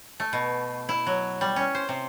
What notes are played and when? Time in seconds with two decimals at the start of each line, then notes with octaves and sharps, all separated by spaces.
0.20 A3
0.33 B2
0.89 E4
1.07 F#3
1.41 G3
1.56 C#4
1.75 C5
1.89 C3